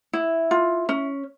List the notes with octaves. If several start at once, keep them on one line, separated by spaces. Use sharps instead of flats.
E4
F4
C#4